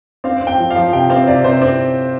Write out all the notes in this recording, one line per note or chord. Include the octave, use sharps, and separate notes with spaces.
C4 F5
C4
G5
F3
F3 F5
C3 G5
C4 F5
C3 D5
C3 C5
C4